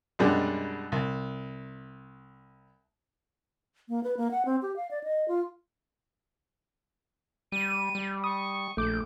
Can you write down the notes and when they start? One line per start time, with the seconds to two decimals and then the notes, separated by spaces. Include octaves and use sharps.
0.19 F#2 B2 G3 G#3 C#4 D4
0.92 C2
3.89 A#3
4.04 B4
4.17 A#3
4.31 F#5
4.45 C4
4.62 G4
4.76 F5
4.91 D5
5.04 D#5
5.28 F4
7.52 G3 D#7
7.95 G3
8.24 C#6 D#6
8.77 A#1 A3 D6 G6